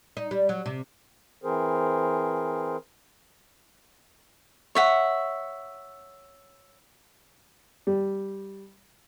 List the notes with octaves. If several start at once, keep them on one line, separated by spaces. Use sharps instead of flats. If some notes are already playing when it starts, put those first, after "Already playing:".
D#4
G3
F#3
C3
E3 C4 G#4 A#4 C5
C#5 E5 F#5
G3